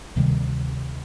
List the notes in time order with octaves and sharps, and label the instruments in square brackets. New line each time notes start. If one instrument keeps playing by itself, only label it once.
[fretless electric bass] D2 C3 D#3 G3